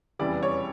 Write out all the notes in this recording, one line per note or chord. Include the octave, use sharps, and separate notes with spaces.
F1 E2 C#3 E3 G3 D5
C#5